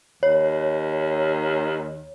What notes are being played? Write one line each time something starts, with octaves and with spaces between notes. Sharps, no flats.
D#2 C#5